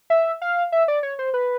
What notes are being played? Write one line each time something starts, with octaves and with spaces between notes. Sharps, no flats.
E5
F5
E5
D5
C#5
C5
B4